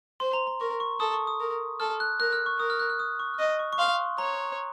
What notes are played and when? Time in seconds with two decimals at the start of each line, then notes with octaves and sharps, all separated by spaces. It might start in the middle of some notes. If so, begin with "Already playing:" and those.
0.20 C5 C6
0.33 A#5
0.47 A#5
0.60 A#4 C#6
0.80 C#6
1.00 A4 D#6
1.13 C#6
1.27 D#6
1.40 A#4
1.80 A4 F6
2.00 F#6
2.20 A#4 F#6
2.33 F6
2.46 C#6
2.59 A#4 D#6
2.70 F6
2.80 F#6
2.90 F6
2.99 D#6
3.19 C#6
3.34 F6
3.39 D#5 D#6
3.59 C#6
3.73 C#6
3.79 F5 C6
4.18 C#5 A#5